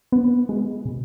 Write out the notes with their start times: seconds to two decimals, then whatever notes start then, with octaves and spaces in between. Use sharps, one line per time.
0.12 B3
0.49 G#3
0.85 B2